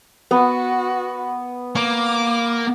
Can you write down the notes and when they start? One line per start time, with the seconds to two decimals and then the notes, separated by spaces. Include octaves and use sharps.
0.31 B3 F#4
1.75 A#3 D6